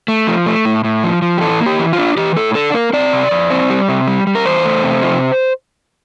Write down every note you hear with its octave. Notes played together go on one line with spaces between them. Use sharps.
A3
F3
A3
A2
A2
F3
F3
G4
E3 A4
A#3
G4
E3
F4
D4
E3 G4
A2 A4
D4 A4
A#3 A#4
C4 D5
C3
F2
C4
G3
C3
G3
G3
A#4
E2 C5
A3
C3
F3